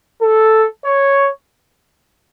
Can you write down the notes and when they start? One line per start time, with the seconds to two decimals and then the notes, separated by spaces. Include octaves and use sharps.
0.22 A4
0.85 C#5